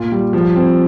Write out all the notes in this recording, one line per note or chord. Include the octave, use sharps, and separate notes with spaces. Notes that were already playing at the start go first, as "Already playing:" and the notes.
Already playing: A#2 F4
G3
F3
C4